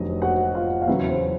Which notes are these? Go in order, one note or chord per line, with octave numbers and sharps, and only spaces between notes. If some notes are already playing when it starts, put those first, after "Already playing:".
Already playing: F1 F2 D3 F#3 D#4 D#5
F#4 F#5
F4 F5
F5
E2 C#3 F#3 E4 E5
C5